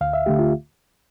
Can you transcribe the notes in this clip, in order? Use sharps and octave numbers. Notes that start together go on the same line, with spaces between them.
D2 F5
E5
D3 A3 G4
F4